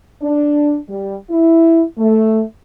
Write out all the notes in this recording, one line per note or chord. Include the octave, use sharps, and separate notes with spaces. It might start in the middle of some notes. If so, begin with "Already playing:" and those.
D4
G3
E4
A3